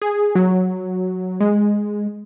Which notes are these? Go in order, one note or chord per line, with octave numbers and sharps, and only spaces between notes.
G#4
F#3
G#3